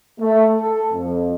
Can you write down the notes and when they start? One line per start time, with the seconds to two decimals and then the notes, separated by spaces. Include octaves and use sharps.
0.20 A3
0.60 A4
0.93 F2